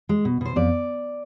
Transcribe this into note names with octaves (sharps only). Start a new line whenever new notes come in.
G#3
B2
B2 C5
F2 D5